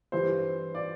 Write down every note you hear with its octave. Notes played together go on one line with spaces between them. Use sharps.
G2 E3 G3 C5
D5